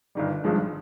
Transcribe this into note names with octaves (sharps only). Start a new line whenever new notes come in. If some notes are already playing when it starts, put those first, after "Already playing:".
G1 G2 D#3 G3
G#1 G2 F3 G#3